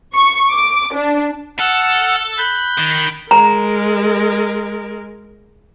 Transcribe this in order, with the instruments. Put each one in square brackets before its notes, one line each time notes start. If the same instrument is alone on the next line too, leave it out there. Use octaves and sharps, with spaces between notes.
[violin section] C#6
D6
D4
[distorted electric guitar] A4 [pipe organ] F#5 E6 F6
[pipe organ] B5 F#6 G6
[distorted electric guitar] D#3
[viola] G#3 A#4 [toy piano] A#5